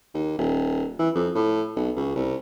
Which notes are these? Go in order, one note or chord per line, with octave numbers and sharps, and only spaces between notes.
D#2
D#1
E3
F2
A2
B1
C#2
C2